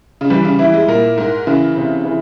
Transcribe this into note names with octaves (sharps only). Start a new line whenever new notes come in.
C#3
E3 G3
C#3
E3 E4
G#3
A#2 A#4
G#2 A#4
C#3 E3
C3
E3